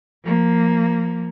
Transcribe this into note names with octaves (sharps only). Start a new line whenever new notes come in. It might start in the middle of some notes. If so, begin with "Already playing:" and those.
F3 A#3